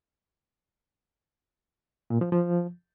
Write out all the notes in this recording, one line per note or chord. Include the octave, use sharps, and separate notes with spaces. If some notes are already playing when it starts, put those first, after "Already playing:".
A#2
F3
F3